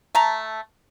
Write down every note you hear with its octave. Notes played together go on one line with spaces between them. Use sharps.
A3 A5 A#5